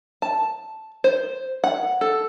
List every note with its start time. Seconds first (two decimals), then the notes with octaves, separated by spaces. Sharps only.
0.22 A5
1.04 C5
1.64 F#5
2.01 A4